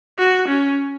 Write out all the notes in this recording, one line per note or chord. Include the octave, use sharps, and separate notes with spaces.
F#4
C#4